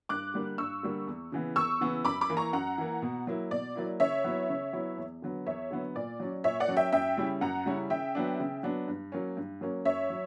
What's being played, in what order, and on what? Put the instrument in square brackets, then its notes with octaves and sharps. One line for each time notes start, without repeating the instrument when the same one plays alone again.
[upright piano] G2 [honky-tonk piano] D6 F#6
[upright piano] D3 G3 A#3
[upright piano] G2 [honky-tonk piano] C#6 E6
[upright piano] D3 G3 A#3
E2
C#3 E3 B3
[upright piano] E2 [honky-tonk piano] C#6 E6
[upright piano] C#3 E3 B3
[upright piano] F#2 [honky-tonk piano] B5 D6
[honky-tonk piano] B5 D6
[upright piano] E3 A#3
[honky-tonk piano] A#5 C#6
[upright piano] F#2 [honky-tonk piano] F#5 A#5
[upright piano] E3 A#3
B2
F#3 A#3 E4
[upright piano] B2 [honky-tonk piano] D5
[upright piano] F#3 A#3 E4
[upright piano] C#3 [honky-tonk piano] C#5 E5
[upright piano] F#3 B3 E4
C#3
F#3 B3 E4
E2
D3 F#3 B3
[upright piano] E2 [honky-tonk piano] C#5 E5
[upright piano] D3 F#3 B3
[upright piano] A#2 [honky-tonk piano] D5
[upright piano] F#3 C#4
[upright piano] A#2 [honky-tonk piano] C#5 E5
[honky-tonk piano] D5 F#5
[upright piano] F#3 C#4
[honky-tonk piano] E5 G5
[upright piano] F#2 [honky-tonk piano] E5 G5
[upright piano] C#3 G3 C#4 E4
[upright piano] F#2 [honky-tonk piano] F#5 A#5
[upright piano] C#3 G3 C#4 E4
[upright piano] C#3 [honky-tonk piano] E5 G5
[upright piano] F#3 B3 D4
C#3
F#3 B3 D4
G2
F#3 A#3 C#4
G2
F#3 A#3 C#4
[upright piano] F#2 [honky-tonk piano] C#5 E5
[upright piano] F#3